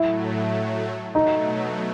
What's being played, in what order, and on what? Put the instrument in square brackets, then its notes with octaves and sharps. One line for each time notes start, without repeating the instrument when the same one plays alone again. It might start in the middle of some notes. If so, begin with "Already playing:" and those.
Already playing: [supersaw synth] A2 F#3 A3 [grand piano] E4
[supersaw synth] B2 F#3 A3 [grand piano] D#4